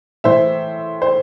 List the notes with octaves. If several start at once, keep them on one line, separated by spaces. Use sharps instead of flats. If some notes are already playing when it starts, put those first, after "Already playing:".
A2 E3 C5 E5
C5